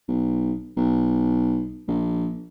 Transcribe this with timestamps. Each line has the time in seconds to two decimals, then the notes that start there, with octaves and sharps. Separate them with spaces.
0.08 B1
0.76 B1
1.88 A#1